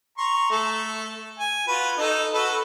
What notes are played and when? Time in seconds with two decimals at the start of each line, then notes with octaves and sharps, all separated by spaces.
0.18 A#5 C6 C#6
0.51 A3 A4
1.40 G#5
1.67 F4 F#4 B4
1.98 D#4 A4 D#5
2.34 F#4 A4 B4